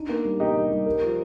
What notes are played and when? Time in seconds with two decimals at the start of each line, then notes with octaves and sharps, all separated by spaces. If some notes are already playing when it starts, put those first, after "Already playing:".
Already playing: D4 D#4
0.09 A#3
0.25 G3
0.40 A#3 D#4 G4
0.55 G3
0.71 G3
0.86 A#4
1.02 F3